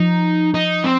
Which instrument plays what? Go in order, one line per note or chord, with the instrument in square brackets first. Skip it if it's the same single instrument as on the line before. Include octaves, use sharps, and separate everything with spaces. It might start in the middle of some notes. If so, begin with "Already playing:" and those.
Already playing: [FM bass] F3 [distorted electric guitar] D#4
[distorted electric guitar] D#4
C4